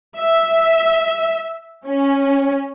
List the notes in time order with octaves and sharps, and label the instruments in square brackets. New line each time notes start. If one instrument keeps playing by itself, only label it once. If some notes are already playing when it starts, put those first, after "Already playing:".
[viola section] E5
C#4